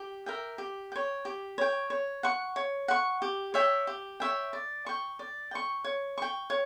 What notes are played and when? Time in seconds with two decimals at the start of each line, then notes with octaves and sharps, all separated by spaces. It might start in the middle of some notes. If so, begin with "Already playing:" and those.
Already playing: G4
0.26 A#4 E5 G5
0.58 G4
0.92 C#5 G5
1.25 G4
1.58 C#5 G5
1.90 C#5
2.23 F#5 C#6
2.56 C#5
2.88 F#5 C#6
3.22 G4
3.54 C#5 E5 G5
3.87 G4
4.20 C#5 E5 G5
4.53 D5
4.86 G5 C#6
5.19 D5
5.51 G5 C#6
5.84 C#5
6.18 G5 C#6
6.50 C#5